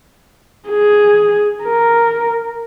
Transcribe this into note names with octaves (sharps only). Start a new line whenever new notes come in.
G#4
A#4